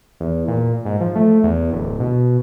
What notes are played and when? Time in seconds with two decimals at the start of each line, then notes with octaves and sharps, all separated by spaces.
0.20 E2
0.48 A#2
0.85 G#2
1.01 F3
1.16 A3
1.43 E2
1.73 D1
2.00 B2